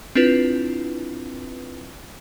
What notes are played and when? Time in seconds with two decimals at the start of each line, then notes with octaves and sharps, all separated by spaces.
0.15 C4 D4 E4 F4 B4